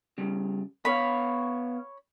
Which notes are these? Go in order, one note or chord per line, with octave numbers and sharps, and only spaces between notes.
C#3 G3
B3 C#5 F5 B5